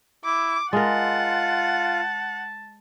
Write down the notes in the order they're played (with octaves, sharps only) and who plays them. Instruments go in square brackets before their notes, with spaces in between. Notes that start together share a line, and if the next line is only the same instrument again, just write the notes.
[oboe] E4 [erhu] D6
[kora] G#3 A#4 [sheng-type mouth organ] F4 [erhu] F#5 [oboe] A5